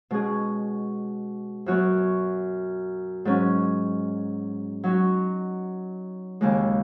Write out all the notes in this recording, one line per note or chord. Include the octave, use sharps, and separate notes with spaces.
B2 G#3 C#4 G#4
F#2 F#3 B3 F#4 C#5
G#2 F#3 C#4
F#3 D#4 F#4
D#2 C#3 G#3